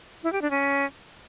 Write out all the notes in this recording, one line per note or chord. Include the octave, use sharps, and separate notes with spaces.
E4
G4
D4
C#4